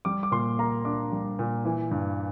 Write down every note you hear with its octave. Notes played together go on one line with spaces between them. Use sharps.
G3 D6
D6
A#2 C6
A#3 A#5
D4 D6
G3
A#2
E3
G2